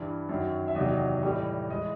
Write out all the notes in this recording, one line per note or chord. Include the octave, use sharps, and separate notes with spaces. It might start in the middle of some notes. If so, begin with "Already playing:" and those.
Already playing: G2 E3 G3
F#2 D#3 F#3
E5
E2 C3 D#3 F#3 D#5
A2 E3 G3
E3 G#3 D#5